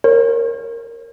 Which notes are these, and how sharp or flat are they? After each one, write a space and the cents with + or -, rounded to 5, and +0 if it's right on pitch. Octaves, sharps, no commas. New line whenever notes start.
A#4 +0 C#5 -40